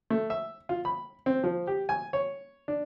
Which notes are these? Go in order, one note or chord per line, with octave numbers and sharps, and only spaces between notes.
A3
E5
F4
B5
C4
F3
G4
G#5
C#5
D4